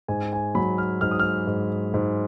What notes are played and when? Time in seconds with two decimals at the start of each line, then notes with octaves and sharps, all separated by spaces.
0.08 G#2 G#5
0.33 G#5
0.55 F#3 B5
0.78 F6
1.01 G#2 F6
1.11 D#6
1.19 F6
1.47 G#2
1.94 G#2